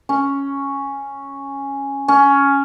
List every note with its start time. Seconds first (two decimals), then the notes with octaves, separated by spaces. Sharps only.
0.09 C#4
2.08 C#4